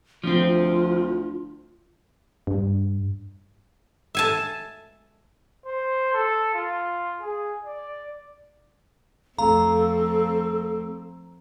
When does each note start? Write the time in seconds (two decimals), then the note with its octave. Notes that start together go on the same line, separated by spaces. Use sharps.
0.24 D2 F3 C4 F4
2.47 G2
4.15 E5 G#5 A5
5.66 C5
6.13 A4
6.54 F4
7.21 G#4
7.64 D5
9.38 F2 F3 A3 C4 A4 F5 A#5